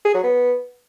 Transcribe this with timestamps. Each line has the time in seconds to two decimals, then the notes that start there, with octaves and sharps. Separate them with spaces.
0.05 G#4
0.14 F#3
0.23 B3